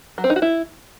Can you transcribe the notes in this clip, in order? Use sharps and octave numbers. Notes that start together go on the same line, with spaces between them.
F#3
C4
D#4
F#4
E4